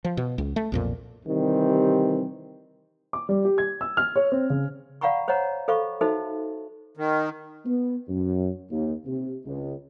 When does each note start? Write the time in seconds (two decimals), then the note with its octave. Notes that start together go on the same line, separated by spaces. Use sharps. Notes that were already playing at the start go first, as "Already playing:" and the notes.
0.05 F3
0.17 B2
0.38 C#2
0.56 A3
0.72 B1 F2 A#2
1.26 C3 D#3 E3 G3 C4
3.13 D6
3.29 G3
3.45 G4
3.58 G#6
3.81 E6
3.97 F6
4.16 C#5
4.32 C4
4.50 C#3
5.01 D5 F5 F#5 A#5 B5 C#6
5.28 C5 C#5 D#5 F#5 A#5
5.68 A4 C5 D#5 F5 B5 C#6
6.01 D#4 F#4 A4 C5 D#5 E5
6.97 D#3
7.65 B3
8.08 F#2
8.70 D#2
9.05 C3
9.45 C#2